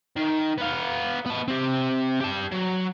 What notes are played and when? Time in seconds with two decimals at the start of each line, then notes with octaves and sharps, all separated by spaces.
0.16 D#3
0.58 B3 F5
1.26 B3 A5
1.48 C4 G4
2.20 G4 A5
2.51 F#3